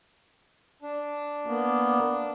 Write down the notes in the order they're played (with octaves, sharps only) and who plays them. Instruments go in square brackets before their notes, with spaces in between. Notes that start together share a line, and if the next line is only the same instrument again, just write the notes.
[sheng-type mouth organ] D4
[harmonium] A#3 B3